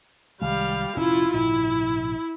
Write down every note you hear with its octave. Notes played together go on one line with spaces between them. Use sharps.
C2 D#3 G3 G#3 F5
F1 A#2 C#4 E4 F4
A#1 G#2 C3 E4